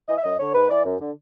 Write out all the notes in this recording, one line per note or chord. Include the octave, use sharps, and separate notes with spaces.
E3 D#5
E5
F#2 D#5
D3 C#5
G#2 B4
E3 D5
F#2
D3